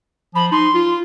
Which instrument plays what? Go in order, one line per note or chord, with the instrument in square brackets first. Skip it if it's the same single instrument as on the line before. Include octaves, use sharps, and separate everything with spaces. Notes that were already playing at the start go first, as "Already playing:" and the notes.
[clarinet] F3 [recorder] B5
[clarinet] D#4 [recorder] C6
[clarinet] F4